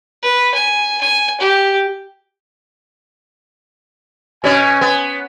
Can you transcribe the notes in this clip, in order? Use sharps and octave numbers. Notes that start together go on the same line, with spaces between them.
B4
G#5
G#5
G4
B2 C#4 G#5
B3